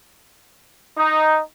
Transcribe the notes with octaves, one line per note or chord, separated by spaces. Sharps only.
D#4